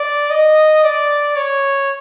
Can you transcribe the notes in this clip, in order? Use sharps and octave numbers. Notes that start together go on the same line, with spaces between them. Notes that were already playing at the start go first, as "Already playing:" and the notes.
Already playing: D5
D#5
D5
C#5